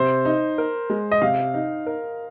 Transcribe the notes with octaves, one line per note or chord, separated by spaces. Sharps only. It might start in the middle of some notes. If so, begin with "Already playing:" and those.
Already playing: C3 C5
D#4
A#4
G#3
D#5
C3 F5
D#4
A#4